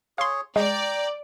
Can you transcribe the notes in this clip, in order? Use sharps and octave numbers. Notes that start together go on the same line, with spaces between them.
G#4 C#5 F5 C6
G#3 D5 G5 A#5